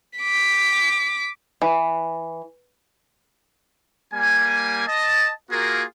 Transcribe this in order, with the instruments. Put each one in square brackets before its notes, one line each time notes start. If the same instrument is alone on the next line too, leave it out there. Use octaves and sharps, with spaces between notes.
[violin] D6 B6
[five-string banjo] E3
[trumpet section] G3 A#3 G#5
D#5 A5
A#3 F4 F#4 G#4 A#4